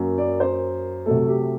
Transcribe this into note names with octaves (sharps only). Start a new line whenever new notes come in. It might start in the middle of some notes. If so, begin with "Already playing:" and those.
Already playing: F#2 F#3 A#3
D5
C5
C3 F#3 A3 A4
G4